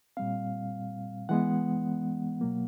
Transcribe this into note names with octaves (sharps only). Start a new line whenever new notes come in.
A#2 G3 C4 F5
E3 G#3 B3 F#5
B2 F#3 A#3